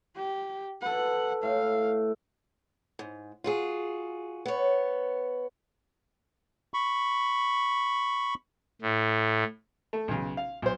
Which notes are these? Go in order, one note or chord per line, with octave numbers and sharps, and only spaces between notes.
G4
A4 B4 F#5
A2 F5
G#2
F4 F#4 G#4
B3 C#5
B5 C#6
A2
A3
B1 C#3
F5
B1 C5